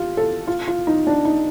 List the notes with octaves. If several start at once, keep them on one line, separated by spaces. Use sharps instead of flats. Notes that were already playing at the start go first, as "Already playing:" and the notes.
Already playing: F4 G4
A4
F4
F4
D#4
D4
D#4